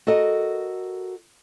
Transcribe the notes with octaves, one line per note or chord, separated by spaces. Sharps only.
F#4 A4 A#4 D#5